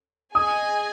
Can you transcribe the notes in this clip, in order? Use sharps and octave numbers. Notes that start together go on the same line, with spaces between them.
G#4 D#5 G#5 D#6